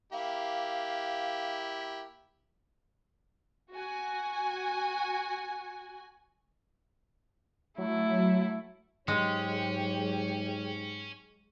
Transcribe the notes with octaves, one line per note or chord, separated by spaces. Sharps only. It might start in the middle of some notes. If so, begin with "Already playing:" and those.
A#3 E4 G4 F5
F#4 G#5
F#3 A3 E4
G#2 F#3 G#3 C#4 G4 C#5